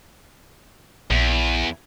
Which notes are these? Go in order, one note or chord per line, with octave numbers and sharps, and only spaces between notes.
A#1 E2